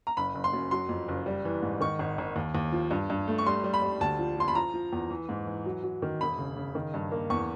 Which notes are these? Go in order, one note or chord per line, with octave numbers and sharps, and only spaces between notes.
A#5
F#1 B5
F#1
C6
F#2
F#3 C6
F2
F#1
G3
E3
G#2
D#3 C#6
G#1
G#1
D#2
D#2
F3
G2
G2
A3
C#6
G3 C6
G3
B5
G3
D2 A5
F3
F3 C6
B5
F3 A#5
F3
E2
E3
G#2
E3
F#3
F#3
D#3
E1 B5
C#3
C#3
D#3
G2
A#3
E2 C#6